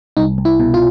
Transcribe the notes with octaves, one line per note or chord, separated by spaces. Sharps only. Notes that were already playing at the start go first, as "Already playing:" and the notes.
C2 D#4
C2
E4
B2
F4